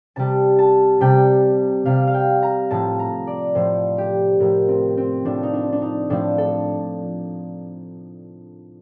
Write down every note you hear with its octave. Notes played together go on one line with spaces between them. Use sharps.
C3 G3 A5
A5
C3 G3 G5
C3 G3 F5
F5
G5
A#5
A2 F3 A5
A#5
D5
A2 F3 C5
G4
A2 F3 A#4
C4
C4
A2 F3 D4
D#4
D4
D4
D#4
A2 F3 D4
A4